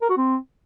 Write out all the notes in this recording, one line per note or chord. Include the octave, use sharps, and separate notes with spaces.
A#4
F#4
C4